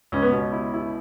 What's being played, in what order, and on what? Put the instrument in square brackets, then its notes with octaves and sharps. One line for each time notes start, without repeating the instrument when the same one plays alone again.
[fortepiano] C#2 [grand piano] C#4
[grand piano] B3
[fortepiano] B2 [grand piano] C#4
[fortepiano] E4
E4